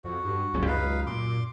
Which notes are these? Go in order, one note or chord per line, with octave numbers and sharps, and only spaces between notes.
F2 F#4
G2
D1 C#2 F#2 C#4
F#2 D#4 B4 F5
A#2 C6 D6